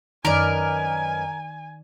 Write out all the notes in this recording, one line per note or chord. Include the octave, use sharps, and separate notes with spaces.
F#2 D#3 A#4 B4 D5 D#5 G#5